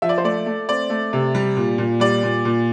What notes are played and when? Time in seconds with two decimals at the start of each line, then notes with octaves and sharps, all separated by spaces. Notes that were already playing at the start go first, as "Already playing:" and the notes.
0.02 F3 E5
0.09 D5
0.18 C5
0.24 A3 D5
0.46 A3
0.69 C4 D5
0.90 A3
1.13 C3
1.35 G3
1.56 A#2
1.78 A#2
2.00 G3 D5
2.23 A#2
2.45 A#2